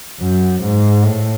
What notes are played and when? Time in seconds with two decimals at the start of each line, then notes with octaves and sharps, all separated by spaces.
0.20 F#2
0.63 G#2
1.04 A2